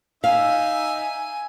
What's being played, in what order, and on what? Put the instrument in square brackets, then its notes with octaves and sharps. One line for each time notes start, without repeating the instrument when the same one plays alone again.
[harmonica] D#4 E5 [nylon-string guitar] F5 [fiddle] G#5